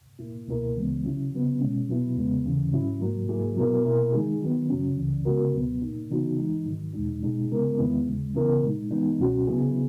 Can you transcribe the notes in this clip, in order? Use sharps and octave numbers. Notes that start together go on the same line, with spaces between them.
A#2 A#3 E4
C#2 B2 A#3 E4 A#4
C#2 C#3 E3 G#3 B3
C#3 F#3 C#4 E4
C#3 F#3 B3
B2 G#3 C#4
B2 F#3 B3 E4
E2 C#3 G#3 B3
D#2 C#3 E3
G#2 F#3 C#4 E4
G#2 F#3 A#3
G#2 F#3 A#3 E4 G#4
B2 F#3 B3 E4 A#4
B2 A#3 E4 A#4
D#3 G#3 D#4 G#4
D#3 F#3 B3
F#2 C#3 F#3 C#4
C#2 C#3 E3
C#3 G#3 B3 F#4 A#4
C#2 B2 F#3 B3
A#2 A#3 D#4
C#3 E3 B3 D#4 F#4
E3 G#3 D#4
G#2 D#3 F#3
E2 B2 G#3 D#4
B2 G#3 D#4 G#4
C#3 G#3 B3 E4 A#4
E2 D#3 G#3 B3 E4
D#2 C#3 G#3
C#3 E3 B3 E4 A#4
A#2 G#3 D#4
E3 G#3 B3 D#4
C#2 B2 F#3 C#4 F#4
C#3 F#3 B3 E4 G#4